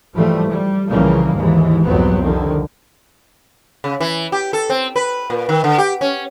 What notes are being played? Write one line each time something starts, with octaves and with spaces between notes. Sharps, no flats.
G#2 E3 F3 G3 A3
G3
C2 C#3 E3 F3 G3 A#3
D#2 G#2 E3 G#3
C2 F2 G#2 F#3 B3 C4
C2 D3 D#3 F3
C#3
E3
G4
A4
C4
B4
A#2
D#3
D3
G4
C#4